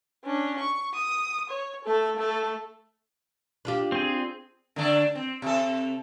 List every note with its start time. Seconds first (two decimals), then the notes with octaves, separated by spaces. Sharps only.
0.24 C#4 D4
0.59 C#6
0.94 D#6
1.49 C#5
1.84 A3 A4
2.16 A3 A4
3.65 D4 F4 G4
3.92 C4 G#4
4.76 D3 A3 D4
5.15 C4
5.42 C3 A4